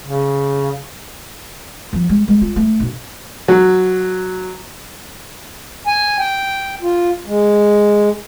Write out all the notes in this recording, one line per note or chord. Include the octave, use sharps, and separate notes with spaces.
C#3
F3
G#3
G#3
F4
A3
B1
F#3
G#5
G5
F4
G#3